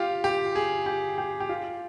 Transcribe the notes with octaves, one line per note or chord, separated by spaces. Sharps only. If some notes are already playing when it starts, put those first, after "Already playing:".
Already playing: F4 G4
G4
G#4
G4
G4
G4
F4